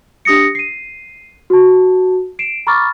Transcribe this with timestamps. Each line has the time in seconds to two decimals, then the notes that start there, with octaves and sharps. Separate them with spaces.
0.25 D4 G4 D#6 A#6 C#7
0.55 C7 D#7
1.50 F#4 A5
2.39 C7 D7 E7
2.67 A#5 B5 C#6 D6 F6 A6